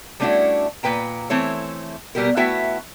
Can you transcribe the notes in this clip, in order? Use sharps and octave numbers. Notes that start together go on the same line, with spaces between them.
G3 A3 C#4 D4 E4 F#4
A#2 F#3 B4 G5 A#5
E3 A3 C4 E4 C#5
B2 G3 B3 G4 A#4
A3 B3 E4 F#4 E5 G5